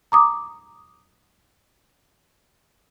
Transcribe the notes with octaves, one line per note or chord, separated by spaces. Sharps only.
A#5 D6 D#6